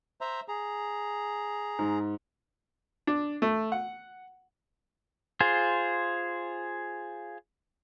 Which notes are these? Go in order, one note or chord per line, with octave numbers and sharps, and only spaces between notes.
C5 E5 A#5
G#4 A#5
G#2
D4
A3
F#5
F4 G#4 C5